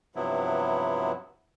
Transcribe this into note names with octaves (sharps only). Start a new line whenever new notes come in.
G2 C3 F3 F#3 B3 E4